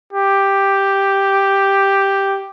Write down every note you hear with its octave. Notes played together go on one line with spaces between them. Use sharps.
G4